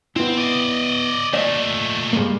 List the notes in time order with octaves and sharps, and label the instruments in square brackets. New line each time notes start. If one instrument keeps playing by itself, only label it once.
[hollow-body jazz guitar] B3 E4 [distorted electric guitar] C4
[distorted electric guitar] D5 D#5
[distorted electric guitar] A#2 A3 [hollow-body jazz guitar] D5 D#5 F5
[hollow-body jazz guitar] G2 G#3 A#3